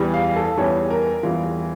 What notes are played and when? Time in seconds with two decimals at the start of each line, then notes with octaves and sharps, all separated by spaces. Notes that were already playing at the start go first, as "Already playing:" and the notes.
Already playing: E2 E3 G3
0.14 F5
0.36 A4
0.57 E2 E3 G3 C#5
0.90 A#4
1.23 E2 E3 G3 F4